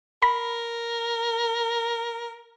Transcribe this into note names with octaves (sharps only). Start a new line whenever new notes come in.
A#4 B5